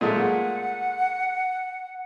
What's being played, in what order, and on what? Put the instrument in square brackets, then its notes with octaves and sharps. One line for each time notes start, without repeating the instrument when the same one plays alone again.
[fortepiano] A#2 G#3 A3 [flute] F#5